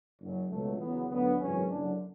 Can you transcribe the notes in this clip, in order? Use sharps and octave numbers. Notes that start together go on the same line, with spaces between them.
F#1 F#2 C#3 F#3
C#2 B2 F#3 A3
E2 C#3 F#3 B3
D2 D3 F#3 B3
G#1 F#2 C#3 E3 C#4
F#1 F#2 D3 D4